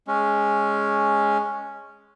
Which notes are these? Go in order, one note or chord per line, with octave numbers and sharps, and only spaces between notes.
G#3 C#4